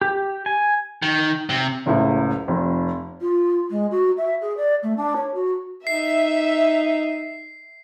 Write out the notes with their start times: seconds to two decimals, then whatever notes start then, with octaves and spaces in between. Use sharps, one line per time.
0.02 G4
0.46 G#5
1.02 D#3
1.50 C3
1.86 F#1 C#2 A2
2.48 F1 F2
3.21 F4
3.70 G#3
3.91 F#4
4.17 E5
4.41 G#4
4.57 D5
4.83 A3
4.97 D4
5.16 C#5
5.34 F#4
5.87 D#4 E5 C7